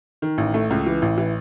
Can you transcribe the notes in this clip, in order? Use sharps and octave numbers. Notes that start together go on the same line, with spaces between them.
D#3
A1
A3
C#2
E3
A1
E3